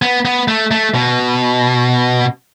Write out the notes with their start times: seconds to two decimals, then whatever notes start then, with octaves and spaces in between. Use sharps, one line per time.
0.02 B3
0.25 B3
0.48 A3
0.71 A3
0.95 B2